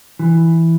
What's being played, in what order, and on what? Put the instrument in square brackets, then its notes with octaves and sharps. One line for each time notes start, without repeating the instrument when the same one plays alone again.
[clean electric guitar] E3